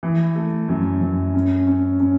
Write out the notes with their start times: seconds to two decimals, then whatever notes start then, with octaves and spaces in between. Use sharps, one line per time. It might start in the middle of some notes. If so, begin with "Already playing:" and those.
0.03 E3
0.36 A3
0.69 F#2
1.01 F#2
1.34 C#4
1.67 C#4
2.00 C#4